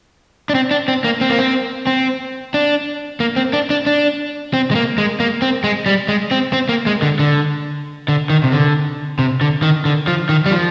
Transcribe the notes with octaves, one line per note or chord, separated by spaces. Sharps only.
D4
C4
D4
C4
A#3
C4
A#3
C4
C4
D4
A#3
C4
D4
D4
D4
C4
G#3
A#3
G#3
A#3
C4
G#3
G3
G#3
C4
C4
A#3
G#3
D3
D3
D3
D#3
C3
D3
C3
D3
D#3
D3
F3
D#3
G3
F3